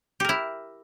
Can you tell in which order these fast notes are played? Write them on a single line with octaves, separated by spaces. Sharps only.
G4 A#4 E4